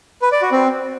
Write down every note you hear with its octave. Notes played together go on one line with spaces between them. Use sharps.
B4
D5
F#4
C4